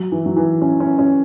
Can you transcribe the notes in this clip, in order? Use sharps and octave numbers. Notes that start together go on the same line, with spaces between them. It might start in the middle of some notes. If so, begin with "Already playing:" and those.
Already playing: F#3
E3
F#3
E3
C#4
C#4
C#4